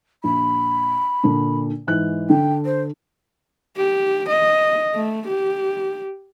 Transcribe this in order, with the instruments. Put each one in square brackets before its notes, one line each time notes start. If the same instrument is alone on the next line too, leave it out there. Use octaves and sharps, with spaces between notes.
[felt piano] A#1 [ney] B5
[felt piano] A#2 D3 D4
G#2 E3 F#6
[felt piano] D3 D4 [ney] G5
[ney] C5
[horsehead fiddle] G4
D#5
A3
G4